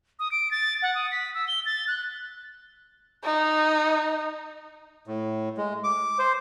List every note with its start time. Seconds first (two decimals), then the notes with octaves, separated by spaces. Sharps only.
0.19 D#6
0.32 D7
0.51 A6
0.82 F#5
0.95 D#6
1.12 B6
1.34 E6
1.48 G7
1.66 A6
1.88 F#6
3.24 D#4
5.07 A2
5.57 G#3
5.84 D6
6.19 C5